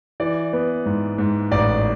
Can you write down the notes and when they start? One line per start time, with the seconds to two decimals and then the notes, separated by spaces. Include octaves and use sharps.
0.20 E3 D5
0.53 B3
0.86 G#2
1.18 G#2
1.51 A1 D5